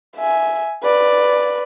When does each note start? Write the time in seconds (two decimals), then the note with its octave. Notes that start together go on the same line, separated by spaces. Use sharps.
0.17 E5 G#5
0.83 B4 D5